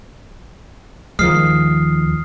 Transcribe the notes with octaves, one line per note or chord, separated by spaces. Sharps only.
D#2 D#3 F3 G#3 D#6 F6 C7